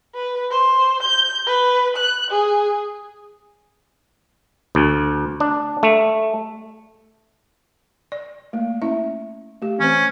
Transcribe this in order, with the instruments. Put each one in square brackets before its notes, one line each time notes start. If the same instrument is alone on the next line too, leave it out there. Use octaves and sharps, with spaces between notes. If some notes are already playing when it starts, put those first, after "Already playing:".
[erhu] B4
C5
G6
B4
F#6
G#4
[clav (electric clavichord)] D2
D4
A3
[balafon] D5
A3 A#3
C#4 E4 E5
A3 G4
[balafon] E3 C4 C5 [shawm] C#4